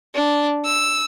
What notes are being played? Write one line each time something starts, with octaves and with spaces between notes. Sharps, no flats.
D4
E6